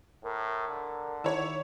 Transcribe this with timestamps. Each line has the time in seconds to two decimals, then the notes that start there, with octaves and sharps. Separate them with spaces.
0.24 A2 A#4
0.69 D3
1.24 D#3 E4 C#5